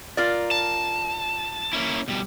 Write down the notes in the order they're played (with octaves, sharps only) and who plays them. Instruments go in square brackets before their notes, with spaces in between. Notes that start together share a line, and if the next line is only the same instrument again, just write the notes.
[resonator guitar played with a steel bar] F4 A#4 D5
[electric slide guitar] A5
A#3 C#4 E4
B2 G3